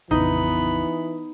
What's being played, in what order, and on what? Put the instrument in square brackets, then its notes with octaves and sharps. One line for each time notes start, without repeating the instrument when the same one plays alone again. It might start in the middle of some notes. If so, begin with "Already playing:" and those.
[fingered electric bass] A#1 F2 C#3 [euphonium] E3 [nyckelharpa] B3 B5 [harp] D#4